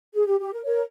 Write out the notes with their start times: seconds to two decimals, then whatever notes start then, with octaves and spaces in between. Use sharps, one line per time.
0.14 G#4
0.27 G4
0.40 G4
0.52 A#4
0.65 A#4 C#5